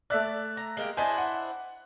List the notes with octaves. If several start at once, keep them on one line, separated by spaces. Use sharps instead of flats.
A3 D5 E5 F#6
A#5
G#3 A#3 G4
D4 E4 C5 D#5 G#5
F#5